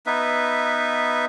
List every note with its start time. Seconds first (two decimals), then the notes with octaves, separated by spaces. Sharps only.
0.06 B3 D#4 B4 E5